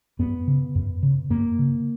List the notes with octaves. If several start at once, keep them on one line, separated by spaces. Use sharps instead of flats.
F#2 B3
C#3
F#2
C#3
F#2 A#3
C#3